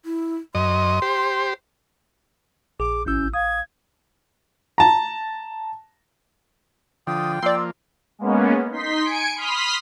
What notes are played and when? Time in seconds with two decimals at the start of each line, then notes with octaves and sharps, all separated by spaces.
0.05 E4
0.55 F#2 D#5 C6
1.02 G4 C5
2.80 A#1 G#4 D6
3.06 G#1 C#4 E4 E6 G6
3.34 F5 D#6 G#6
4.78 A5 A#5
7.07 D3 F3 G5 D#6
7.42 F3 A#3 D5 C6 E6
8.19 G#3 A#3 B3 C#4
8.71 D#4 C6 B6
9.04 G#5 G#6 C#7 D7
9.35 B5 C6 D#6 F6 B6